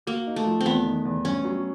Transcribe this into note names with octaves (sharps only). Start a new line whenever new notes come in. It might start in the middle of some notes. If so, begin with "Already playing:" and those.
A#3 F#4
D#4
A3
F3
C4
E2 B3
D#3
E2
G2 C#4
F#3